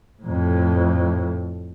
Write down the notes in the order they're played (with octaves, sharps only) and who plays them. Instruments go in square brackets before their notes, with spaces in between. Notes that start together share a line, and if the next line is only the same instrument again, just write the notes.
[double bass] F2 A2